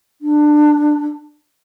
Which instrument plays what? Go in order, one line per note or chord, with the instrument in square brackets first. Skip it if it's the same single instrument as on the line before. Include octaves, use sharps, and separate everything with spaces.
[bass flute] D4